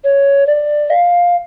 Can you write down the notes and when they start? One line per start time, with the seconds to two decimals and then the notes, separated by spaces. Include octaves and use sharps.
0.04 C#5
0.47 D5
0.90 F5